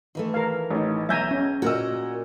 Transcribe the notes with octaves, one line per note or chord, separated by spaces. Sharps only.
D#3 E3 A3
A#4 F5
A1 D#4
B1 E5 G#5 A#5 G6 A#6
C#4
A#2 F#4 A#4 D#5 E6